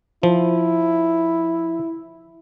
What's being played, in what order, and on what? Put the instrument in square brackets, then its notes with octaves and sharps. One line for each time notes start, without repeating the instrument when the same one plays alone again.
[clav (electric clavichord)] F3 [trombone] E4